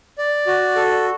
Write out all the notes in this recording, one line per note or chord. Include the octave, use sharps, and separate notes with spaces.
D5
F#4
A4